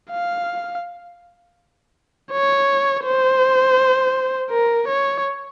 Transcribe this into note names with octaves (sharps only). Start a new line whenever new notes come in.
F5
C#5
C5
A#4
C#5